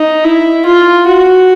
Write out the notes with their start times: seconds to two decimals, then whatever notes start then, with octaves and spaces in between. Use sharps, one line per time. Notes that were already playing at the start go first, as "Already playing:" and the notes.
Already playing: D#4
0.24 E4
0.65 F4
1.07 F#4